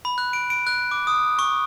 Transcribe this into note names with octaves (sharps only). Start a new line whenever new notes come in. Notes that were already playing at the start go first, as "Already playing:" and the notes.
B5
F#6
D7
D7
F#6
D6
D#6
C#6